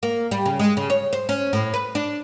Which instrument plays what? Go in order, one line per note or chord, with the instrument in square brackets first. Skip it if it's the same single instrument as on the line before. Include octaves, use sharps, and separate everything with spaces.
[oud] A#3
G3
C#3
G#3
C#3
C#5
C5
C#4
A2
B4
D4